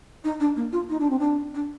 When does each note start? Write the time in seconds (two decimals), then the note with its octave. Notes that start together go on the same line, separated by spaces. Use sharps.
0.24 D#4
0.40 D4
0.56 A#3
0.72 F4
0.89 D#4
1.00 D4
1.10 C4
1.19 D4
1.54 D4